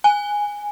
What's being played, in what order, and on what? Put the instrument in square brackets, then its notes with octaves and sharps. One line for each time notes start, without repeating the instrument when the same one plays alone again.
[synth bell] G#5